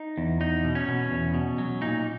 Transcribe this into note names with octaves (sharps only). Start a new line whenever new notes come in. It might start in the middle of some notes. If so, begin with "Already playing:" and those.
Already playing: D#4
E2
E2 D#4
B2
C#4
B2
E2
B2
F#3
A#2 D#4